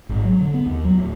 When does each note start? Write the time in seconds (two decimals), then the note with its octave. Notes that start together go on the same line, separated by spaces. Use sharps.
0.09 G#1
0.25 F#3
0.41 D3
0.54 B3
0.66 D#2
0.84 F#3
0.98 D1